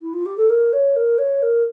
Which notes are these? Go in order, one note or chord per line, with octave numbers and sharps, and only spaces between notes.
E4
F4
G4
A4
A#4
C#5
A#4
C#5
A#4